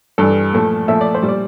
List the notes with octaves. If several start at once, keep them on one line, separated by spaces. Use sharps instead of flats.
G2 E3 G3 A4
A#2 F3 A3
A#2 F3 A3 E5
D5
C5
A#2 G3
D5